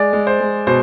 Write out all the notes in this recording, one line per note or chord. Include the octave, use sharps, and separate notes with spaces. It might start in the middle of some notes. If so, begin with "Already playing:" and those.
Already playing: G#3 D5
G#3
C5
G#3
B2 C5